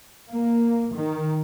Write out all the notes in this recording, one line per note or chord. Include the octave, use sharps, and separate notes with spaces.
A#3
D#3